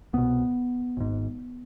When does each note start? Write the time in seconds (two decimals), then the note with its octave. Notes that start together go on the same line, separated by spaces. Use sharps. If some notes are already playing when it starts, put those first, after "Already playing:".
0.13 C2 B2 B3
0.97 G#1 G#2